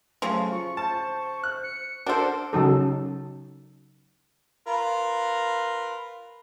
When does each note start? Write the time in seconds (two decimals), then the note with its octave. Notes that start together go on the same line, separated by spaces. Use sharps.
0.22 C#3 F3 F#3 A3
0.52 F4 C#6
0.77 C5 A5
1.43 F#6
1.63 C#7
2.06 D4 F#4 A4 A#4 C5 D6
2.53 C#3 F#3 D#4 A4
4.67 F4 A#4 B4